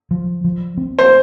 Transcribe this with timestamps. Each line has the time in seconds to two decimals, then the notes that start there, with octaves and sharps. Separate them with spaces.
0.11 F3
0.44 F3
0.77 C4
0.99 C5